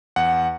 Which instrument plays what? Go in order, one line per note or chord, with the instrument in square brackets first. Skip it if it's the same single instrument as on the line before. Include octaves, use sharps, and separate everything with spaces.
[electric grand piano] E2 F#5